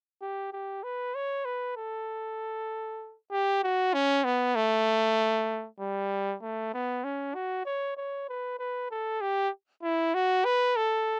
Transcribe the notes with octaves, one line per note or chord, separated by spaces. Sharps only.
G4
G4
B4
C#5
B4
A4
G4
F#4
C#4
B3
A3
G3
A3
B3
C#4
F#4
C#5
C#5
B4
B4
A4
G4
E4
F#4
B4
A4